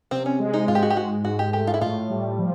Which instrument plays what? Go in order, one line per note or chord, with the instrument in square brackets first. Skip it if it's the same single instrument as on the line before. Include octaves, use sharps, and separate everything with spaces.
[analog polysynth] C3 [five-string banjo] C4
[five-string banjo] C#4
[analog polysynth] G#3
[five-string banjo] D#4
[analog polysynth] G#2 [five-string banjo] F4
[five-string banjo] G4
F#4
G4
[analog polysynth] G#3 [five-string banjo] F#4
[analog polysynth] G#2 [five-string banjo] F#4
[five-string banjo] G4
[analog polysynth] A3 [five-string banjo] G4
[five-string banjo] F4
E4
[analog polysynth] A2 [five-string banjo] F4
[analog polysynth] G3
F3